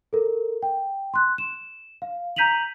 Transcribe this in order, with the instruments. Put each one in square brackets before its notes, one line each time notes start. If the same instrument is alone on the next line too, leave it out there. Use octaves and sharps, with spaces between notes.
[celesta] A4 A#4
G5
C6 F#6
E7
F5
A#5 G6 B6 D#7 F7 F#7